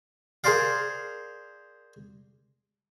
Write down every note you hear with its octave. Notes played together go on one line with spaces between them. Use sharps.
G#4 A#4 C5 D5 F5